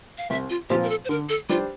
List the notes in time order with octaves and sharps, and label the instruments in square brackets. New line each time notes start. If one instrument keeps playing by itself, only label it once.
[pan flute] F5
[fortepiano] C2 [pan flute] E5
[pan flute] F4
[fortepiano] A#2 F3 C4 F4 [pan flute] G4
[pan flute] A#4
A4
C5
[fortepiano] D3 [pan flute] A#4
[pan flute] A4
[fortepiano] G3 D4 G4 C5 [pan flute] F4